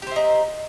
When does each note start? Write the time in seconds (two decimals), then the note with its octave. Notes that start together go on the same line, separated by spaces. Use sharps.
0.02 G4
0.07 C5
0.11 E5
0.16 D#4